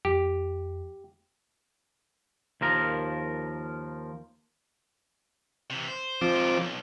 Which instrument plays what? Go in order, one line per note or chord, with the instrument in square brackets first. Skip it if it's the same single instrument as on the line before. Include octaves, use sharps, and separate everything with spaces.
[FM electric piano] F2 [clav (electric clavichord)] G4
[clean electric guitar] D#2 F3 A#4
[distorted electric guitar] C3 E3
C5
[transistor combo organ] F3 C4 D6
[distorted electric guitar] G#2 D#3
B1